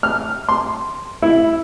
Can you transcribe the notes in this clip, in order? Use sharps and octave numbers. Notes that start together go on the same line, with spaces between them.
F6
C6
E4